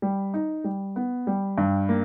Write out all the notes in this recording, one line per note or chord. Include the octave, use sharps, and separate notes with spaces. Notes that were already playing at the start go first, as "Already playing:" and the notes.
G3
D#4
G3
B3
G3
G2
A#3